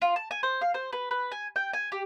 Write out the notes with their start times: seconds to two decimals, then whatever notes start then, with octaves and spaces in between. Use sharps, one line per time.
0.02 F4
0.16 A5
0.31 G#5
0.43 C5
0.61 F5
0.74 C5
0.93 B4
1.11 B4
1.32 G#5
1.56 G5
1.73 G#5
1.92 G4